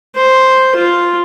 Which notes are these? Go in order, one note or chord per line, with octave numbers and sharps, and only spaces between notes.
C5
F4